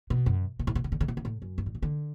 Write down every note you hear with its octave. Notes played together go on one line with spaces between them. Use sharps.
B2
F#2
B2
A2
B2
C#3
D3
C#3
B2
C#3
A2
F#2
G2
A2
C#3
D3